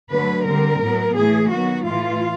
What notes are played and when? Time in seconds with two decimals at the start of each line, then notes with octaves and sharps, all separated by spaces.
0.10 D3 F#3 A3 B4
0.46 D3 G3 C4 A#4
0.81 A2 F#3 B3
1.16 A2 E3 A3 G#4
1.51 D#3 F#3 B3 F#4
1.86 A2 E3 A3 F4